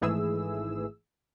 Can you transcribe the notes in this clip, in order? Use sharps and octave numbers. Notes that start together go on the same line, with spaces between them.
G#1 G#2 E3 A3 G#4 E6